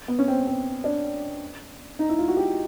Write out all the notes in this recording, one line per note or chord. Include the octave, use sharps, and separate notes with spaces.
B3
C#4
C4
C4
D4
D#4
E4
F4
F#4
G4